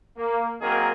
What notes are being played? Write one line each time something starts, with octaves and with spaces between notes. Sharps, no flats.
A#3
D#3 F#3 A#3 C4 G#4 A#4